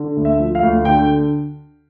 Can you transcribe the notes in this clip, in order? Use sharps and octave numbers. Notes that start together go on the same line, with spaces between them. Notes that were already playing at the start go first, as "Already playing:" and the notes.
Already playing: D3
D2
E5
F3
F5
D2
D3 G5